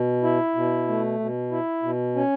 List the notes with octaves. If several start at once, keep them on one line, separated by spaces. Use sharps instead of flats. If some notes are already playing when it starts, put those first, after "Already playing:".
Already playing: B2
E4
B2
A3
B2
E4
B2
C#4